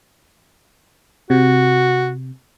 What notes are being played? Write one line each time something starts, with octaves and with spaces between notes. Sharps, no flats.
C3 F#4